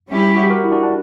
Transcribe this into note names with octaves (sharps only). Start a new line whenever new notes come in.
G3 C#4 E4 G4
F#4
G4
F#4 A#4
E4
D4 F#4
D4